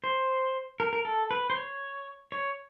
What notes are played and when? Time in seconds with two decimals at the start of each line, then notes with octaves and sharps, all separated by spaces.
0.04 C5
0.80 A#4
0.93 A#4
1.05 A4
1.31 B4
1.50 C5
1.55 C#5
2.32 C#5